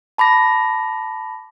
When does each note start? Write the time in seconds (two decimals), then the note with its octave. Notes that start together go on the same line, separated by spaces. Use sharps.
0.18 A5 B5 D6 A#6